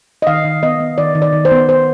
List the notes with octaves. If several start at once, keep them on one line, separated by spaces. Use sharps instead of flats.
D#5
D#3 F5
D#3
B3 D#5
B3
D#3 D5
D#3
D5
D#3
C5
B3
B3 C5